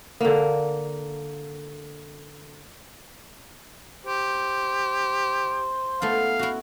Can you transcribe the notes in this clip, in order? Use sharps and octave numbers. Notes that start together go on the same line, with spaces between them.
D3 A#3
G4 C5
A3 B3 E4 F5
E4 F#4